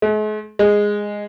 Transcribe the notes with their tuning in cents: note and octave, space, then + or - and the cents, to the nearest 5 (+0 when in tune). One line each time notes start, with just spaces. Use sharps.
G#3 +45
G#3 -10